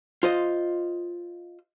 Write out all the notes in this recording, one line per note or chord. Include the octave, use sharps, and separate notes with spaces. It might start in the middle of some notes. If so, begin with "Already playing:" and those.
F4 C5 D#5